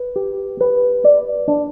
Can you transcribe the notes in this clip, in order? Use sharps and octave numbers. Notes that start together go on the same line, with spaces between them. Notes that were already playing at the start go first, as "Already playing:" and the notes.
Already playing: B4
G4
B4
D5
D4